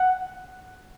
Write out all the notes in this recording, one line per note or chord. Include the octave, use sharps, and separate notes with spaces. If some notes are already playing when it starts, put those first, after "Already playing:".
Already playing: F#5